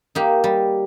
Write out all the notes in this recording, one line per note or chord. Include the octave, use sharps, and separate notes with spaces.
A#3 D#4 G4
G3